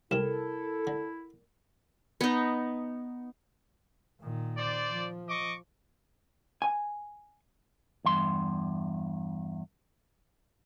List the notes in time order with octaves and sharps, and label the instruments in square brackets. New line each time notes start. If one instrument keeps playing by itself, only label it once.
[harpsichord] C2 C3 [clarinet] E4 [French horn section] A4 [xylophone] A#4 E7
[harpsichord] D3
[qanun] B3 D#4
[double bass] A#2 D#3
[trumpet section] C5 D5
[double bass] F3
[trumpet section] D#5 C#6 D6
[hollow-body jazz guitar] G#5
[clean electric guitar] E2 G2 C6